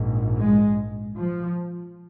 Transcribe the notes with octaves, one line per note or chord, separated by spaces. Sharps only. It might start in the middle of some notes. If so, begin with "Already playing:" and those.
Already playing: A#1 G#2
G#3
F3